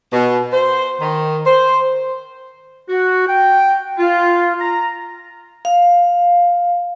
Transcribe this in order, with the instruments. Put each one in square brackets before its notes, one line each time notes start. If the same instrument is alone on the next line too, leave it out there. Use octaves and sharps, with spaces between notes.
[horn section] B2
C5
D#3
C5
[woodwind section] F#4
G5
F4
A#5
[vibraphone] F5